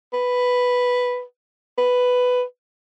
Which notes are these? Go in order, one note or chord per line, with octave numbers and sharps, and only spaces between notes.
B4
B4